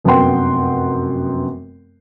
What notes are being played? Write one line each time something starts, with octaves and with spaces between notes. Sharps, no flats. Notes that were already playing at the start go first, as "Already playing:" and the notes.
F1 F#2 B3 F#5 G5 C6